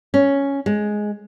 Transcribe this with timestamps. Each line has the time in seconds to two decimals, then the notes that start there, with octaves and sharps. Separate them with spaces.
0.14 C#4
0.66 G#3